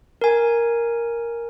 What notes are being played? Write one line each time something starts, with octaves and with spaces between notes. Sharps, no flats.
A#4 G#5